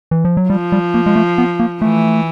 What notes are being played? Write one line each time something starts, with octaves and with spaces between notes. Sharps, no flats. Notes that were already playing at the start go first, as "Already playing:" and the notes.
E3
F3
F#3
F3 G3
G3
A#3
G#3
A3
B3
A#3
E3 A3